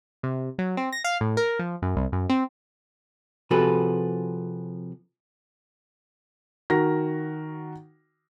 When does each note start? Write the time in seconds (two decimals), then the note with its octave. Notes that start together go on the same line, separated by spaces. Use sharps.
0.23 C3
0.59 F#3
0.77 C4
0.93 A#6
1.04 F5
1.21 A2
1.37 A#4
1.59 F3
1.82 F#2
1.96 C2
2.12 F#2
2.29 C4
3.51 C3 F3 F#4 G#4 A4 B4
6.70 D#3 F#4 A#4 A#6